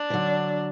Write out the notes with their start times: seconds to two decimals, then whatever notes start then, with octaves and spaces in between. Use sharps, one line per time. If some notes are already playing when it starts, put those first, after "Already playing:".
Already playing: D4
0.10 E3
0.13 D3 F#3